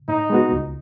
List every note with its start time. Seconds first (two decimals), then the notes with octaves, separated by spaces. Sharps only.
0.08 A2 D#4
0.30 G#3 B3 F#4
0.52 C#2